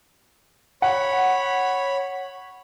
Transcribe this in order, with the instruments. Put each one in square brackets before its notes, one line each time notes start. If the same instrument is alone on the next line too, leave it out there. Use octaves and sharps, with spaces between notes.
[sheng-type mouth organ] C#5 B5 [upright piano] F#5